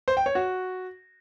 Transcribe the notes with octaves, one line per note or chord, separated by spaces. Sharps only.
C5
G5
C#5
F#4